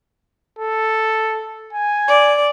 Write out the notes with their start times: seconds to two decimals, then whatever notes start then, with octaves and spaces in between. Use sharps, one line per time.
0.59 A4
1.73 G#5
2.08 D5